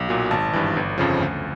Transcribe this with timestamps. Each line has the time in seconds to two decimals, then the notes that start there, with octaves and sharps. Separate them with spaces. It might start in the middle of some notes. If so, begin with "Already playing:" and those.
Already playing: B1
0.09 A#2 F#3
0.31 G#1 A5
0.53 G2 E3
0.77 G1
0.98 F2 C#3 F3
1.20 D2